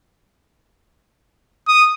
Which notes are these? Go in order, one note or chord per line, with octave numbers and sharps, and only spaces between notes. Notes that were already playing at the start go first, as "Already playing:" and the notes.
D#6